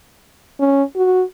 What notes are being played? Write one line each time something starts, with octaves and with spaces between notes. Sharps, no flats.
C#4
F#4